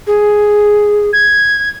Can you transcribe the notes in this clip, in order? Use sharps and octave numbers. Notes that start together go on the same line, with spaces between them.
G#4
G#6